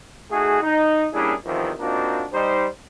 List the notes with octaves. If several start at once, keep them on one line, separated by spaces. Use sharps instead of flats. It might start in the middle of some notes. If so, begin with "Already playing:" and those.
A3 D#4 F#4 G#4
D#4
G3 A#3 C#4 D4 E4 G#4
E2 C3 D#3 F3
A#3 C4 D4 D#4 F4 F#4
G3 D#4 C5